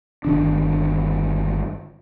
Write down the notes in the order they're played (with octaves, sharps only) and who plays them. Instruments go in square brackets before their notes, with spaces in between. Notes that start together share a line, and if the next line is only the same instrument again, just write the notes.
[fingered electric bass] G1 D#3 D4